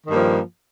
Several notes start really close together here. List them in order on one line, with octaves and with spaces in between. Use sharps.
D#3 G2 A#3 F3